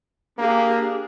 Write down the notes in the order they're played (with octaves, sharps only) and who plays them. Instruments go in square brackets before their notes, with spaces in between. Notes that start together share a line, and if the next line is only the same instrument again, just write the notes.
[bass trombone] A#3 [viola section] D4 G4 G#4